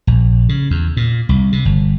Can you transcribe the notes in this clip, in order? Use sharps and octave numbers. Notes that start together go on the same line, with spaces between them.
A#1
C#3
E2
A#2
C2
C3
G1